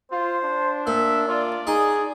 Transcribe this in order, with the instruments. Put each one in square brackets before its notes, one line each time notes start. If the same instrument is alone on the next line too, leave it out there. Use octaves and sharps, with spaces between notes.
[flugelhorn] F4 [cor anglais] C5
[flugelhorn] D4
[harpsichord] A#2 [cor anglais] E5
[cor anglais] F4 [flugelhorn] D5
[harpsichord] D#4 [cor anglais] G#4